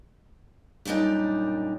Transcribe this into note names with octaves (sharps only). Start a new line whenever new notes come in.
F#2 A#2 G3 D4 D#4